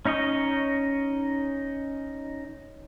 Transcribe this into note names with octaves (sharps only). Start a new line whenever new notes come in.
C#4 D#4 C#5 D#5